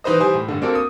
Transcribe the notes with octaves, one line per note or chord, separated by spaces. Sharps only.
E3 D#4 B4 C5 D#5
E3 G3 C5 G#5 D#6
A2
G2 D3
A#3 C4 D4 F#4 A4 A#4
D#6